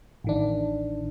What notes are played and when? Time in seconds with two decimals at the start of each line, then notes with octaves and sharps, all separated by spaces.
0.24 A1 D#3 D4